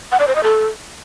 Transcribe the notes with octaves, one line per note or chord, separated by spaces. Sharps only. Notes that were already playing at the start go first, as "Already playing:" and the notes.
F#5
D5
C5
D#5
A4